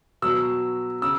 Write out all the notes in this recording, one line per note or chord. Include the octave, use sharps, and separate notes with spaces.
B2 F#3 E6
C#3 E6